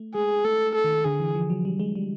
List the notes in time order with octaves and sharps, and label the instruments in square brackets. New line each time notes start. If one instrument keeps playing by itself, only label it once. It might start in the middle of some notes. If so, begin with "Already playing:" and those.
Already playing: [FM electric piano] A3
[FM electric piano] G#3 [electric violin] G#4
[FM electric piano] A3 [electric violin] A4
[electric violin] A4
[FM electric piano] D#3
[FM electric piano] D3 [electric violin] G#4
[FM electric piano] E3
F3
F#3
G3
G#3
G3